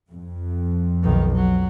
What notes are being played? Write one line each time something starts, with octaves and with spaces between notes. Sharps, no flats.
F2
B1 D#3
F#3